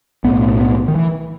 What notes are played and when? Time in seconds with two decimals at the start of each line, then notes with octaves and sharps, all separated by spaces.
0.24 B1 A2 B3
0.60 B3
0.88 D#3
0.95 E3